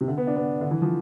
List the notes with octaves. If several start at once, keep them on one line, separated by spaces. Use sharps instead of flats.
C3
D3
B3
D4
B3
D3
E3
F3